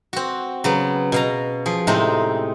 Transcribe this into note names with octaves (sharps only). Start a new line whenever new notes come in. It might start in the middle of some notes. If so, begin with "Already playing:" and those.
C4 F#4
C#3 F#3 B3
B2 F5 A#5
F3 G#4
A2 C3 G#3 C4 D#4